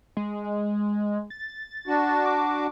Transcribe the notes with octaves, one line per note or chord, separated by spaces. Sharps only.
G#3
A6
D4 F#4
D6